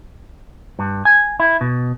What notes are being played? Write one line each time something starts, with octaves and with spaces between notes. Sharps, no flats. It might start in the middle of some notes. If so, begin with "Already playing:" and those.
G2
G#5
E4
B2